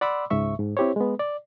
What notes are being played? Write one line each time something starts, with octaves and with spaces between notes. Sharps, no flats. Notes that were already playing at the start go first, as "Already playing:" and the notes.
D5 F#5 B5 C6 D6 E6
C#2 G#2 E5 C#6
G#2
C4 E4 G4 C5 C#5
G#3 B3
D5